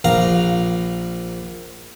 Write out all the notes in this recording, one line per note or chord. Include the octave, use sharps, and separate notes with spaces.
A#1 F5 A#5